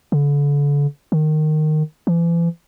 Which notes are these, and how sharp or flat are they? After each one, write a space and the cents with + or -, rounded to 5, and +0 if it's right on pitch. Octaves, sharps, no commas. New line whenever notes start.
D3 -35
D#3 -15
E3 +40